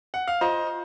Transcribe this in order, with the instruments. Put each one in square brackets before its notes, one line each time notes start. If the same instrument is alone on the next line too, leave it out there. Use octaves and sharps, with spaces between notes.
[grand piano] F#5
F5
[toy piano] F4 [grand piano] C5 D#5